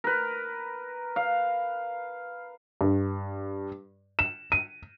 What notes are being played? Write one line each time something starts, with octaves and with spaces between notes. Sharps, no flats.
A#4 B4
F5
G2
E7
D#7